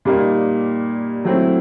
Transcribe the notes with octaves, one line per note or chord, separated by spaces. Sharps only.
A#2 G3 A#3 D#4
F#3 A3 C4 E4